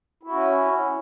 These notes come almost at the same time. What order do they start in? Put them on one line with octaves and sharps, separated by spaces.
E4 F#4 C#4